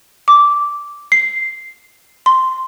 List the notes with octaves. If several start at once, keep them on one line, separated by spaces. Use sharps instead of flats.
D6
C7
C6